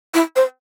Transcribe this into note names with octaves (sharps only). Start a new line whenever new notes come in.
E4
C5